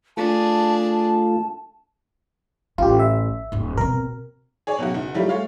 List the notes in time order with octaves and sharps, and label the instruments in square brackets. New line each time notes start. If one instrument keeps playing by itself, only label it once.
[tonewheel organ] A3 F4 [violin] D4 G#4 [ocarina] A5
[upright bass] A1 [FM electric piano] F4 G4
[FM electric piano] E5
[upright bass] D#1 G#2
[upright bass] B2 C4 [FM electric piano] A#4
[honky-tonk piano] G#4 C#5 D5
B2 F#3 C#4 F#4
F#1 F#5
F#3 G3 A3 E4 F4
G#3 A3 C#5 F5